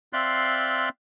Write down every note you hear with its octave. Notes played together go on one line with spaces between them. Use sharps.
C4 D5 E5 F5 C6 F#6